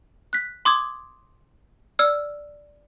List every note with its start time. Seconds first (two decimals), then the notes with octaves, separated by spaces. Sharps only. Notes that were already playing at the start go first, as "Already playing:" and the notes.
0.33 F#6 B6
0.65 C6 D6 D#6 G#6
1.99 D5 E6 F6